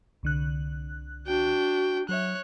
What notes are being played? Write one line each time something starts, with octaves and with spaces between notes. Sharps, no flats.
C2 D3 F#6
D4 F#4 G5
F#3 C#5 E5 F#6